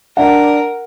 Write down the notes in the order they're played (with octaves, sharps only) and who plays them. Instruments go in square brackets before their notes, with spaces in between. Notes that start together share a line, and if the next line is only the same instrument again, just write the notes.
[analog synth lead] D4 [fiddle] A#4 [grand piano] F#5